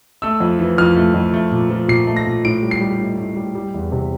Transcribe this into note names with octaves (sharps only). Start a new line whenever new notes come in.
A3 E6
F2
E3
F2 F6
A3
F2
A3
A#2
F3
A#2 C7
A3
A#6
A#2
A2 D7
G3
C7
G3
A2
A2
G3
G3
E2
C3